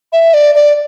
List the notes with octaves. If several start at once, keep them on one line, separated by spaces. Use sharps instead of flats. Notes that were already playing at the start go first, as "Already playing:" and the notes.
E5
D5
D5